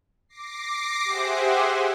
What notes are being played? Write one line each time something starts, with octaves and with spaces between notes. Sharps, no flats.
D6 A#6 C7
G4 G#4 C5 E5 F#5 G#5